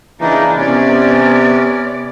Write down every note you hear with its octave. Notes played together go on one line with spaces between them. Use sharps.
C#3 E3 A#3 D4 D#4
C3 B3 C#4 D5